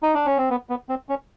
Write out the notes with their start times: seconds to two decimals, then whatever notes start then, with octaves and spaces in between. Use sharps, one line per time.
0.03 D#4
0.15 D4
0.26 C#4
0.37 C4
0.50 B3
0.69 B3
0.89 C4
1.09 C#4